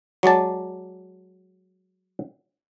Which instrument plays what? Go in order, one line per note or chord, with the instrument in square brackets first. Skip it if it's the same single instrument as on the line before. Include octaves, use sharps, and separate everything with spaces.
[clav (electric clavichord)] F#3 G#3 D5 A5